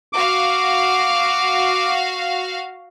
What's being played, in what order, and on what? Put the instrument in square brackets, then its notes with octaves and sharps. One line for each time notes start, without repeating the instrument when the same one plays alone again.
[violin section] F#4 F5 [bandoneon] D6